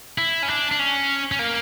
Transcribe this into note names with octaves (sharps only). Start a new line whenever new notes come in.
E4
C#4
D4
D4
C#4
C#4
A#3